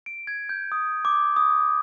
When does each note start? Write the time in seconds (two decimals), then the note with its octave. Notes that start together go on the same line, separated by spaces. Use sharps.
0.06 D7
0.27 G#6
0.49 G6
0.72 D#6
1.05 D6
1.36 D#6